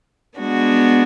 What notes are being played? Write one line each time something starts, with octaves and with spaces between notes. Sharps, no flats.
G#3 B3 D4 F#4